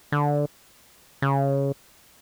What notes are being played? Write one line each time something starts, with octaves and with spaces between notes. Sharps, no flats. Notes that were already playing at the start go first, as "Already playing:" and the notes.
D3
C#3